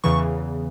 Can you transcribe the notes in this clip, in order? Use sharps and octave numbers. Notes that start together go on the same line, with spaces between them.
E2 C#3 E3 C#6